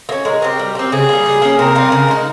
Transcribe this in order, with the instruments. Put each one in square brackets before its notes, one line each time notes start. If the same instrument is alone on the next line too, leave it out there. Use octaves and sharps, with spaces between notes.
[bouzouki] A#3
C#4
[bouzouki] G#3 [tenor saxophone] A#4
[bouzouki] C4 G4
G3
C4 G4
[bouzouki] C#3 [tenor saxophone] G#4
[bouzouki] G3 A#3
G3
A#3 C#4
[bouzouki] C3 [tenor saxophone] A#4
[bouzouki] G3 C4 F4
C#3
G#3 D#4